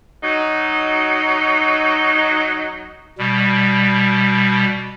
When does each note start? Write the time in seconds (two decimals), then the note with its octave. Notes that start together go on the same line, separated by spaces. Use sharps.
0.23 F#3 D#4
3.18 B2 G3